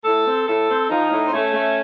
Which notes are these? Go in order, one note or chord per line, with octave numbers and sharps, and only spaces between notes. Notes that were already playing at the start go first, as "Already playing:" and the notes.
A2 A4
C4
A2 A4
C4
F3 D#4
A2
C4
A3 C#4
A3